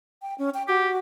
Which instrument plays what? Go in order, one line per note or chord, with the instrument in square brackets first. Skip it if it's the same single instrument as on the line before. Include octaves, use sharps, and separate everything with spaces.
[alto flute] G5
C#4
G5
[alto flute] F#4 [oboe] G4